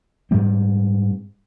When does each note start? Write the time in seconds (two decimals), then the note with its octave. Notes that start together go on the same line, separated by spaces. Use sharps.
0.31 G#2 G3 C4